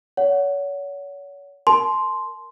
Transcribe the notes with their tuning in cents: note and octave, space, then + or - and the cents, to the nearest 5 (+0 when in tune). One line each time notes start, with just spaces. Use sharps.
C#5 +35 F#5 +0
A#4 +0 A5 -35 C6 +0